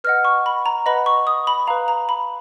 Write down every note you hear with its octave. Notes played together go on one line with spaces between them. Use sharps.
B4 D#5 F#5 F6
C#6
B5
A#5
B4 D#5 F#5 B5
C#6
D#6
B5
B4 F5 A#5
A#5
B5